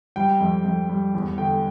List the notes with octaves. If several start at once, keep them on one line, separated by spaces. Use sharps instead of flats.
G3 G5
F2
F2
G3
E2
D3 G5